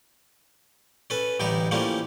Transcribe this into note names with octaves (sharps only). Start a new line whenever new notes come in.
C#4 A4 B4
A1 D2 G3 D#4 E4 C#6
F3 G3 A3 A#3 C#4 E4